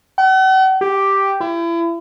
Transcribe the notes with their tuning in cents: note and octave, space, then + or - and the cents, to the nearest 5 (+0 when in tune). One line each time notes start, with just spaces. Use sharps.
F#5 +40
G4 +0
E4 +35